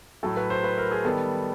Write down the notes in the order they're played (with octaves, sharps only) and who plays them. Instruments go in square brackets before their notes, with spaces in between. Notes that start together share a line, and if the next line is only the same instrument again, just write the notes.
[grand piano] A2 F#3 A3 A4
B4
C5
B4
A#4
G#4
D#3 G3 B3 A4